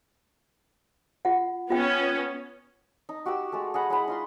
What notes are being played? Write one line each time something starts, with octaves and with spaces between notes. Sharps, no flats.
F4 F#5
B3 C#4 F4 G5
D#4
F#4 G4 F#5 E6
G#3 A3 A4
G#4 D#5 F#5 B5
G#3 E4 F#5 B5
D#4 F4 C6